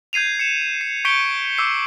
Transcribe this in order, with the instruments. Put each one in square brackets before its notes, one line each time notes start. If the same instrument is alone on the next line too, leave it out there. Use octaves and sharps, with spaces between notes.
[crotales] G6 G#6 C7 D#7 F7
C#7 E7
C7
C#6 G6 B6 C#7 D7 G7
D6 E6 C7